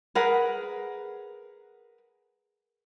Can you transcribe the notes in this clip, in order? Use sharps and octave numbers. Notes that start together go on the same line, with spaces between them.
G#4 A#4 B4 F#5